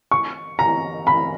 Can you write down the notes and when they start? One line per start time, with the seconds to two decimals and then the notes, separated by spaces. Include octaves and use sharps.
0.11 C#6
0.59 A#5
1.07 B5